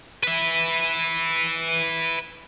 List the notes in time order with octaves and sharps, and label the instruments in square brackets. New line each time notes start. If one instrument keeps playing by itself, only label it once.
[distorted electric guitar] B4 E5